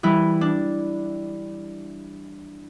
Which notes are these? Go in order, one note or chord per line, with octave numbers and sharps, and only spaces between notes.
E3 G3 E4
D4